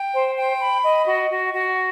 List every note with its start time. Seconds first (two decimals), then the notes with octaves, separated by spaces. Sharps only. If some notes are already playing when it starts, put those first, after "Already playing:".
Already playing: G5
0.14 C5
0.37 G5
0.60 B5
0.84 D#5
1.07 F#4
1.31 F#4
1.54 F#4